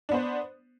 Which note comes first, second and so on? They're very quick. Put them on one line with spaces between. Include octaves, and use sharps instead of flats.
D4 B3 C5